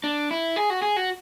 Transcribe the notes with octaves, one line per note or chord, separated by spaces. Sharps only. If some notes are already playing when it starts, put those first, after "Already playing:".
D4
E4
G#4
F#4
G#4
F#4